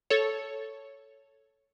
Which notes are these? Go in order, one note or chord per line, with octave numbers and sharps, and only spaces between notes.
A4 C#5